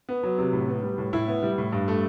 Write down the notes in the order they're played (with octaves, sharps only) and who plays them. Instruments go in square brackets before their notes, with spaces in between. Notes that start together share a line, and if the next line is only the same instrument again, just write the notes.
[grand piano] B3
F#3
C3
A2
B3
G3
A2
A2 E4
B3
G3
A2
G2
A3